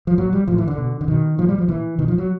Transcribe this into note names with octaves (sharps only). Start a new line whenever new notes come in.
F3
A#2 F#3
G3
A2 F3
E3
D3
B2
D3
B2 D#3
A#2 F3
G3
F3
A#2 E3
B2 D#3
F3
F#3